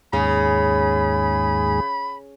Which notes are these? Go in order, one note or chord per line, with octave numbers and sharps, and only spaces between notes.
D#2 G#2 C#3 G#4 B5